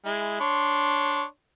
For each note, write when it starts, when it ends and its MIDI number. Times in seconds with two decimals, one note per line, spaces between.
0.05 0.37 56
0.05 0.37 64
0.40 1.23 62
0.40 1.23 73
0.40 1.23 84